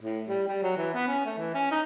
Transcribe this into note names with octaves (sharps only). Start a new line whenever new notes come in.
A2
G3
G3
F#3
E3
B3
C#4
A3
E3
C#4
D#4